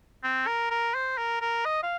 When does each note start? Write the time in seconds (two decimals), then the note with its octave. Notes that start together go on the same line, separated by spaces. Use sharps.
0.23 C4
0.47 A#4
0.70 A#4
0.94 C5
1.18 A#4
1.41 A#4
1.65 D#5
1.83 F5